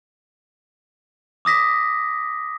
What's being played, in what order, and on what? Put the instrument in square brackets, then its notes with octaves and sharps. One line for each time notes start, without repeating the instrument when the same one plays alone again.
[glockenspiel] D6 D#6 A#6 B6